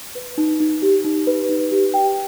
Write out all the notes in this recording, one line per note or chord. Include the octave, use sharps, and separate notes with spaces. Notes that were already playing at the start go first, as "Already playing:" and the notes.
B4
D#4
D#4
G4
D#4
B4
D#4
G4
G5